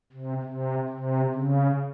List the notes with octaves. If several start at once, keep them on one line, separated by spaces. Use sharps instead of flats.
C3
C3
C3
C#3